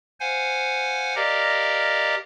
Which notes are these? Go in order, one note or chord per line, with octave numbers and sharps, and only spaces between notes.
C5 F5 F#5 G#5
G4 A#4 D5 D#5 F5 A#5